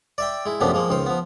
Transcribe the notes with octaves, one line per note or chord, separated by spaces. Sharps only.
D5 E5 G5
G#3 E4
F#2 C3 F3 A3 B3 D4
F3 G#3 A#3
C#2 D#3 C5
F3 B3